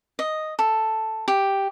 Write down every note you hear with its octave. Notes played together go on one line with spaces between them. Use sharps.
D#5
A4
G4